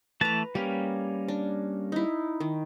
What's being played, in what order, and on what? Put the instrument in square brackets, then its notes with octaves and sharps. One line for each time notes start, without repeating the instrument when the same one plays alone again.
[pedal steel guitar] E3 A3 A5 [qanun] B4 A#5
[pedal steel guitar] G3 A#3 C#4 [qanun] G4
[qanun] D4
D#4 E4
D#3